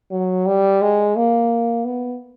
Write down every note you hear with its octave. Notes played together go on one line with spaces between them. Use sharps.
F#3
G3
G#3
A#3
B3